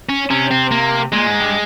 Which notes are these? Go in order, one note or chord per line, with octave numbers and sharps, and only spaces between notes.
C#4
C3 C#4
C4
A#3
A#2 G#3
G#2
G2